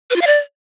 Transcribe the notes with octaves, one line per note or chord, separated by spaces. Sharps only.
B4
F4
F5
D5